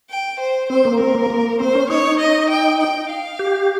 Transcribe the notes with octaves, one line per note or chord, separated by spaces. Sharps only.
G5
C5
C4 C5
A#3
C4 A#4
A#3
A#3
C4 C5
C#4
D#4 C#5
D#5
G5
G5
F5
G4